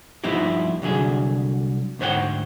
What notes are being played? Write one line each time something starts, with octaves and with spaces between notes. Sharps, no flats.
G2 F3 B3 D#4 E4 G4
C2 D3 F#3 G#4
D2 G#2 C5 C#5 F#5 G5